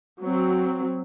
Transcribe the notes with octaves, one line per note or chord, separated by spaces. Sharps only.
F#3 C4